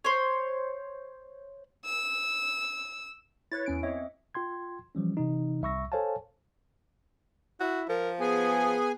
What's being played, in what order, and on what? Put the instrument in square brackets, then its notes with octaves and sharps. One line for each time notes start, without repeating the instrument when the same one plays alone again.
[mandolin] C5 C#5
[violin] E6
[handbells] E4 [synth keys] B4 C#5 A6
[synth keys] E2 C#4 D7
[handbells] C4 D#5 E5 [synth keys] C#5
[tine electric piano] F4 G5 C6 G#6
E3 F3 G3 C#4
C3 E3 D#4
C2 E5 B5 C#6 E6 A#6
A4 C5 C#5 F5 G#5 A5
[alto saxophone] E4 [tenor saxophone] F#4
[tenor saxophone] F3 [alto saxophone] A#4
[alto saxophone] B3 [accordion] G#4 G#5